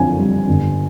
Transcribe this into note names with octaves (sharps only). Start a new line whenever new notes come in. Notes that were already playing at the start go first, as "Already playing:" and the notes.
Already playing: F#1 F2 D3 G#5
G3
G1